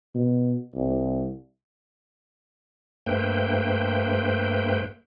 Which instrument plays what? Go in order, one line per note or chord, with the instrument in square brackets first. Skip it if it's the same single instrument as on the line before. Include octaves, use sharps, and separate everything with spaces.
[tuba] B2
C2
[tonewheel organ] G2 A3 A#3 B4 C5 G5